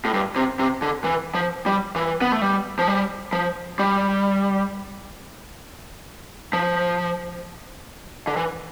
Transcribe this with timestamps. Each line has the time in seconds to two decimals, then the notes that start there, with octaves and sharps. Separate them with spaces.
0.05 A2
0.14 G2
0.36 C3
0.59 C3
0.82 D3
1.04 E3
1.34 F3
1.66 G3
1.96 E3
2.21 B3
2.32 A3
2.42 G3
2.79 F3
2.88 G3
3.33 F3
3.79 G3
6.53 F3
8.27 D3
8.37 E3